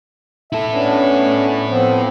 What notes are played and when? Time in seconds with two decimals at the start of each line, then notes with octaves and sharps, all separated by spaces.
0.53 E4 A4 E5
0.70 B3 C#4 D4
1.68 F3 B3 C4